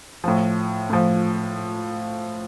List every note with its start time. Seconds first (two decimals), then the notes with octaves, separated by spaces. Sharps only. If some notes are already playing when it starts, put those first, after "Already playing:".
0.24 A2 F3
0.90 A2 F3